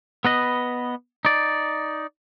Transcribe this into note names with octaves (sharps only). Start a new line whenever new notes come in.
B3 B4 D#5
D#4 D5